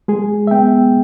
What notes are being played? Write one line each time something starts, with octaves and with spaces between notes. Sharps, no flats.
G#3 G#4
E5
B3 G5